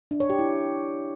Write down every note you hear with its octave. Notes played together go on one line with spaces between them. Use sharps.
D4
C#5
G4
E4